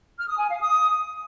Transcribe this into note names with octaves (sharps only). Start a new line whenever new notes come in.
F6
D#6
G#5
F5
D#6